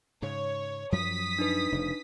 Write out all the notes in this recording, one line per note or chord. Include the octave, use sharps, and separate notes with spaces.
G#2 C#3 C#5
F#2 F3 F#3 D#6 B6
D4 D#4 B4
F1 C#3